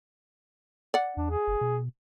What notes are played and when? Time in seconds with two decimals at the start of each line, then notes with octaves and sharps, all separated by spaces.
0.94 D5 F#5
1.17 E2 D4
1.30 G#4
1.47 F#1
1.61 B2